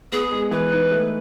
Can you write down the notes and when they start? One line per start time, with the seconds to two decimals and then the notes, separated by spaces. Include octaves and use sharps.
0.12 B3 G#4
0.32 G#3
0.51 E3 B4
0.72 D#4
0.92 A3